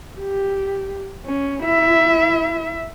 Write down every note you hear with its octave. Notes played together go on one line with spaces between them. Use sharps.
G4
C#4
E4 E5